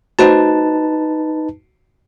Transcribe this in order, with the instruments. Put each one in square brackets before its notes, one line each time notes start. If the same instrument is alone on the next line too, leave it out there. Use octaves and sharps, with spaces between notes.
[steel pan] A3 F#4 C5 [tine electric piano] D#4 B4 A5